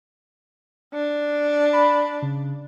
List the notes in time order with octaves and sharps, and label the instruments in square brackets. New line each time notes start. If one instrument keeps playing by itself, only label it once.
[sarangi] D4
[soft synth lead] B5
C#3